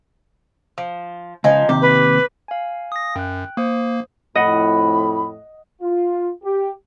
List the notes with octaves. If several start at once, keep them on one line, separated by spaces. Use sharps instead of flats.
F3
C#2 F3 D#4 G#5
D#2 C3 G4
B4
F5 G#5
D#6 A#6
F#2 G5 F#6
A#3 C5 D#6
F2 A2 D#5 F#5 B5
F4
G4